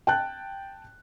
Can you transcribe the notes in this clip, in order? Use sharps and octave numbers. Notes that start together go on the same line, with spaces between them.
G5 A5 F#6